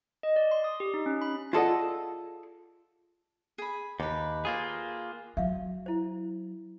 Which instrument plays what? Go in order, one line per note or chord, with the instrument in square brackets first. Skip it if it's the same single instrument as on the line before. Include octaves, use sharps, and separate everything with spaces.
[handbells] D#5
D5
C6
D#6
G4
D#4
C#4
B5
[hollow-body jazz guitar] F4 G#4 A4 D5 D#5 F#5
[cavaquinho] G#4 B5
[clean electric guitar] D#2 [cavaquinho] G4 B4
[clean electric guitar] A#3 F4 G#4
[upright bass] F#3 [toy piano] E5 F5
[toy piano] E4 C5